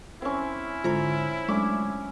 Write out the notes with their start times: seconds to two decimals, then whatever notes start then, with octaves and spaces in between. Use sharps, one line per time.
0.22 C4 C#4 E4
0.84 G#2 D3 F4 C5 A#5
1.49 F#3 G#3 A3 C#4 D4 D6